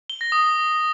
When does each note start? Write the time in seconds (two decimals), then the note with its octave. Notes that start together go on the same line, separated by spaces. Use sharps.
0.10 G7
0.21 A#6
0.32 D#6